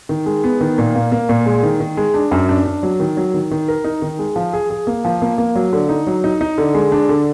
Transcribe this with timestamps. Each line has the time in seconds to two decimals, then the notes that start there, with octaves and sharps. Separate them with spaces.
0.09 D#3
0.26 G#3
0.44 B3
0.60 D#3
0.78 A#2
0.95 A#3
1.12 A#3
1.29 A#2
1.46 G#3
1.63 D#3
1.80 D#3
1.97 G#3
2.14 D4
2.31 F#2
2.49 D4
2.65 D4
2.83 F#3
3.00 D#3
3.17 F#3
3.34 D#3
3.51 D#3
3.68 A#4
3.84 D#4
4.02 D#3
4.19 G#3
4.36 F3
4.53 G#4
4.70 G#4
4.87 A#3
5.05 F3
5.22 A#3
5.38 A#3
5.55 F#3
5.73 D3
5.89 D#4
6.07 F#3
6.24 D#4
6.41 D#4
6.58 D3
6.75 G#3
6.92 D4
7.09 D3